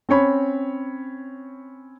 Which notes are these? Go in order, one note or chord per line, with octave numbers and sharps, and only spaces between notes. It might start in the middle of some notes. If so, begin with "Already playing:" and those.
C4 C#4 C#5 B5